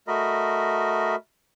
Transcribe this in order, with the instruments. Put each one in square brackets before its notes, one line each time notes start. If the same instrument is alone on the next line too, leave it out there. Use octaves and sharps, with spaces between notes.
[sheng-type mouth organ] A3 F#4 A#4 D#5 B5